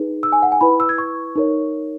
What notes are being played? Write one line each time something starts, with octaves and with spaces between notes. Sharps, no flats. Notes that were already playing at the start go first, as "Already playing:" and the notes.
Already playing: D#4 G#4 B4
E6
G#5
F#5
G#5
E4 B4 B5
E6
G#6
C#6
D#4 A#4 C#5